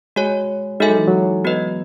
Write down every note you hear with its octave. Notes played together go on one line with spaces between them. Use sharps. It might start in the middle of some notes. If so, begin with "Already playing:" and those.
G#3 F#4 C#5 G#5
G#3 D#4 F#4 A4 E5 G#5
F#3
E3
F#3
B3 F#4 B4 D#5